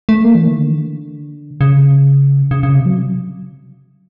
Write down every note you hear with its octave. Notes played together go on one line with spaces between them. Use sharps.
A3
A#3
E3
D#3
D3
C#3
C#3
C#3
C3
F#3